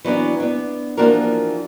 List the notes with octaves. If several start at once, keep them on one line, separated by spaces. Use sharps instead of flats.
E3 F#3 B3 D4
B3 D4
E3 F3 A#3 D4 F#4 A#4